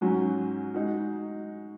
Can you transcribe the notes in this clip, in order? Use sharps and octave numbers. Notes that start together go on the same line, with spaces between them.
G#2 F#3 C#4 F#4
G#3 D#4 F#4